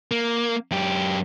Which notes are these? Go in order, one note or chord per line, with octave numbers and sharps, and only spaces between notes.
A#3
F#2 G4